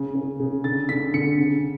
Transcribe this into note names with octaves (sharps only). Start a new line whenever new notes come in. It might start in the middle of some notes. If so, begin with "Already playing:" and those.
Already playing: C#3
C#3
C#3
D3 A6
D3 B6
D3 C#7
C#3